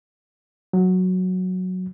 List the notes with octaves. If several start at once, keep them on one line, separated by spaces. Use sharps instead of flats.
F#3